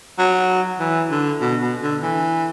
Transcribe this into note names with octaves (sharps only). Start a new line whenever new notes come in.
F#3
E3
D3
B2
B2
D3
E3